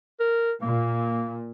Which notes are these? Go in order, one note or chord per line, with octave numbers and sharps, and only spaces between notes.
A#4
A#2 A#3